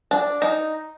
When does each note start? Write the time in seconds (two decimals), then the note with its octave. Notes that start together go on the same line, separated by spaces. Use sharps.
0.11 D4
0.42 D#4